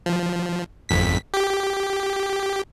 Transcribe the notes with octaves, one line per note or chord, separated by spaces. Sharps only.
F3
G#1 F2 B6
G4